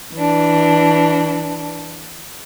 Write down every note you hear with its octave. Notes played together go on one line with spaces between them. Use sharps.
E3 D4